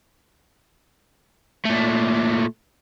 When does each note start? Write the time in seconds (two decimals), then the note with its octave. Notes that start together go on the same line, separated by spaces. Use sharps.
1.66 A#2 A3